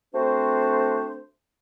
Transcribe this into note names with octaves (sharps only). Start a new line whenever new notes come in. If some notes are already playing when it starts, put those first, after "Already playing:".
A3 C4 D4 F#4 C5